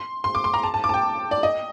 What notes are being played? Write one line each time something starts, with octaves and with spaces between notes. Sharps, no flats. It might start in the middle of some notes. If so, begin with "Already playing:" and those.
Already playing: C6
C6
D6
C6
A#5
A5
A5
D6
A5
G5
D5
D#5